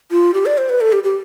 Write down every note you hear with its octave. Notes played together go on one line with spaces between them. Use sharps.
F4
G4
D5
C5
B4
A4
G4
G4